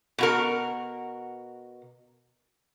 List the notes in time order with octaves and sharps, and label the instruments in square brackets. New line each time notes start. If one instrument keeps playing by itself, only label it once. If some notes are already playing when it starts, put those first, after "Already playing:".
[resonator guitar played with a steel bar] B2 F#4 A#4